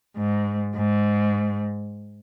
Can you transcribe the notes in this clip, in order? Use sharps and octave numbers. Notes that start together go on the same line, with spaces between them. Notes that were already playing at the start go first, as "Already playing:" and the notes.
G#2
G#2